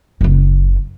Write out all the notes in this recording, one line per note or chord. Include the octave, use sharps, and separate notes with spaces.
F#1 C#3